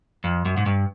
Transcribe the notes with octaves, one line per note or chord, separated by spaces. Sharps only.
F2
F#2
G#2
G2